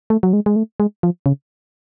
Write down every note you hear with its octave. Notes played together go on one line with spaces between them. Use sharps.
A3
F#3
G#3
G#3
A3
G#3
F3
C#3